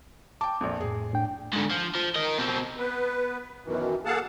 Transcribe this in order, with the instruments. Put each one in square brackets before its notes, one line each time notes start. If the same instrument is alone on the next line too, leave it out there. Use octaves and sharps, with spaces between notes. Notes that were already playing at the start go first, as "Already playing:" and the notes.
[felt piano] G5 A5 [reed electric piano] D6
[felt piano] A#1 F2
[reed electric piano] F2 A2 [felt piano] G#4
[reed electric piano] A2 D4 G5
[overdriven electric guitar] G#2 D3
F3
F3
A#4 D#5
B2 C4
[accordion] B3 B4
F#2 B2 D#3 E3
A#3 G#4 A4 F5 F#5 A5